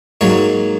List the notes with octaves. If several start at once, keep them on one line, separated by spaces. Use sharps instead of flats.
G#2 F#3 A#3 C#5